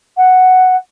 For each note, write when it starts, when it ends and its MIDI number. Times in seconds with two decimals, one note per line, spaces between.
0.17 0.76 78